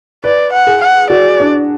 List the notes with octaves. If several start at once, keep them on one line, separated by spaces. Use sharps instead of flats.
B4 D5
F#5
G#4
F#5
F#4 D5
D4